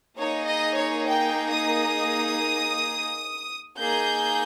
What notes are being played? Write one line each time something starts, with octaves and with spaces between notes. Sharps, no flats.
A#3 D#4 G#4 C#5
D#5
C#5
G5
D#6
A#3 D#4 G#4 G6